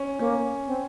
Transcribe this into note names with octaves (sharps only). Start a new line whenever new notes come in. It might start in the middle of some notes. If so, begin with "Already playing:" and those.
Already playing: C#4
A#3 C#4
C4